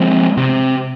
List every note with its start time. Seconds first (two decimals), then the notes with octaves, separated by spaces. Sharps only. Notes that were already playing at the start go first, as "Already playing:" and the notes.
Already playing: F3 G#3 C4
0.37 C3